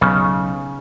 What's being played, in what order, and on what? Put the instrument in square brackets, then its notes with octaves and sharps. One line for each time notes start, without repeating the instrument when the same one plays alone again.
[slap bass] B1 [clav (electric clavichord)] C#3